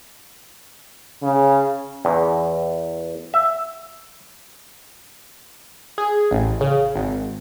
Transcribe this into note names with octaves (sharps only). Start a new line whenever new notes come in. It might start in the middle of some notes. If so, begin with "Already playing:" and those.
C#3
E2
E5
G#4
A1
C#3
G#1